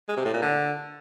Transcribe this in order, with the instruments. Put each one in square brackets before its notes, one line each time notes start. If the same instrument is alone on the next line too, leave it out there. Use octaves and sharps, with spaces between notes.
[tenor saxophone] G#3
C3
A2
A#2
D3